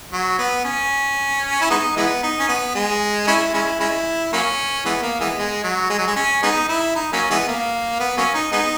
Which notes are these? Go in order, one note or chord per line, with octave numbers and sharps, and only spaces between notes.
F#3
B3
C#4
E4
G#3 B3 D#4
E3 G#3 B3
D#4
C#4
B3
G#3
G#3 C#4 E4
G#3 C#4 E4
G#3 C#4 E4
F#3 A#3 C#4
E3 G#3 B3
A#3
E3 G#3 B3
G#3
F#3
G#3
F#3
G#3
C#4
G#3 B3 D#4
E4
D#4
F#3 A#3 C#4
E3 G#3 B3
A#3
B3
F#3 A#3 C#4
D#4
G#3 B3 D#4